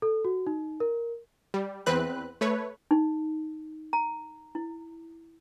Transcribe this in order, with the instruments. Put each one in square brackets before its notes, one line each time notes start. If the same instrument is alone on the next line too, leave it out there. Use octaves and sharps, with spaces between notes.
[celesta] A4
F#4
D#4
A#4
[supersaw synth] G3
E2 C4 B4 F#6
A3 B4 C#5
[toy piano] D#4
A#5
E4